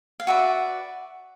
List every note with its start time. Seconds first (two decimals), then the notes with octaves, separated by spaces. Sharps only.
0.20 F5
0.27 F#4 B4 D5 E5